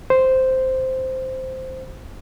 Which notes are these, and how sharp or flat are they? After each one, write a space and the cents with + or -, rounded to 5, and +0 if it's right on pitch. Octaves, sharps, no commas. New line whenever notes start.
C5 -5